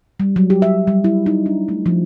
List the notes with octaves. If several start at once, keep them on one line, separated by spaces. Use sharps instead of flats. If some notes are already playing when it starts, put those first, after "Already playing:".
G3
F#3
G4
E5
G3
E4
D#4
D4
A3
F3